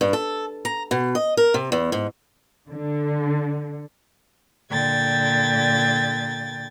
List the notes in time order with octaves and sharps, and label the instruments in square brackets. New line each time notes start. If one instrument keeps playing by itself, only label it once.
[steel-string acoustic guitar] G2
A4
A#5
B2
D#5
A#4
C3
E2
G#2
[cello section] D3
[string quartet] A#2 D3 G5 G#6 A6